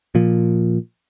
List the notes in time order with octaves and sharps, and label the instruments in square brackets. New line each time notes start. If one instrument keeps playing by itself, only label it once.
[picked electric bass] A#2 F3